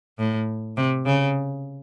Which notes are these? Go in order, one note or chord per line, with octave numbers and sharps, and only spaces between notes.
A2
C3
C#3